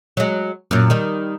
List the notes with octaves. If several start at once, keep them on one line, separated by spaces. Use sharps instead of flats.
F#3 G#3
F#2 A#2
D#3 G3